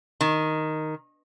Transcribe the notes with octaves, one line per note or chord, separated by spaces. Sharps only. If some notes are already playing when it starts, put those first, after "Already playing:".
D#3